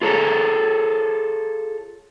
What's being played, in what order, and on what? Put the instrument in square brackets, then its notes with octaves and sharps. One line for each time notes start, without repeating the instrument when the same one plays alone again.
[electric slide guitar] F4 G#4 A4 C#5 A#5